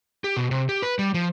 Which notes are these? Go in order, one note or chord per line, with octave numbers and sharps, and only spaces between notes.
G4
B2
C3
G4
B4
G3
F3